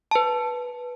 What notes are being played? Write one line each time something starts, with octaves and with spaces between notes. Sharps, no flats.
B4 A5